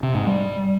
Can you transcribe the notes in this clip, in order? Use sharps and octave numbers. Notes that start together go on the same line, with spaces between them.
C3
G#2
G3